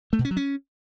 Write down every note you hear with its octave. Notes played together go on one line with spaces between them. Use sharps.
A3
B2
C#4
F#3
C#4